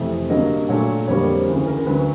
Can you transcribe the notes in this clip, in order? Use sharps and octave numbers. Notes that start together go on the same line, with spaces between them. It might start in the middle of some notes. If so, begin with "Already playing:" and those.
Already playing: F2 C3 E3 A3 E5
G2 D3 F#3 A#3 D#5
A#2 F#3 A3 D4 C#5
F2 D3 G3 A#3 C#5
C5
D2 C#3 E3
A#4
D2 D3 F#3 B4